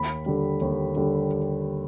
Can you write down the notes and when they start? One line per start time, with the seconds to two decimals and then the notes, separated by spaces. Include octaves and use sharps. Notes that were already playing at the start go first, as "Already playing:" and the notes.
Already playing: D#2 B5
0.26 D3 G3
0.61 D#2
0.96 D3 G3